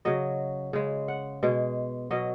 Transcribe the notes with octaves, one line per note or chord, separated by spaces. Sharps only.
C#3 F#3 D#5
C#3 G#3
F#5
B2 G#3
B2 F#3 D#5